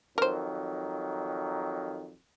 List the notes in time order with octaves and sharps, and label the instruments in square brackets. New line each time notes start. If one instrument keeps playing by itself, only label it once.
[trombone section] F2 D#3 F#3 [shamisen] A#4 C5